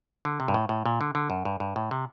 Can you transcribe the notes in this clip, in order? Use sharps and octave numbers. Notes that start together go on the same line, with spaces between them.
D3
C3
G2
A2
A2
A#2
D3
D3
F#2
G2
G2
A2
C3